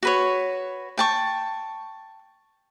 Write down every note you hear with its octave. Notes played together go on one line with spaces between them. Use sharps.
F#4 B4 C#5
G5 A5 C#6